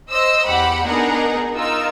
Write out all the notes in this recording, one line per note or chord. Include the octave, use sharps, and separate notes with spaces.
C5 D#5 E6
E2 G4 F#5 B5
B3 D4 D#4 G#4 A#4 F#5
D#4 F4 A#4 E6